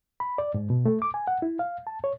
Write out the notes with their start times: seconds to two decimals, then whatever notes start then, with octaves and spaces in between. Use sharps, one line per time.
0.20 B5
0.38 D5
0.54 G#2
0.70 B2
0.85 A3
1.02 D6
1.14 G#5
1.27 F#5
1.42 E4
1.59 F5
1.87 A5
2.04 C#5